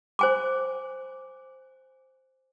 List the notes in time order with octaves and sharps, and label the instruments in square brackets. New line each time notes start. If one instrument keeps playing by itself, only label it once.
[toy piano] C5 G#5 D6